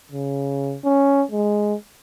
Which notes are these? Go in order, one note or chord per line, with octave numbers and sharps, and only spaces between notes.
C#3
C#4
G#3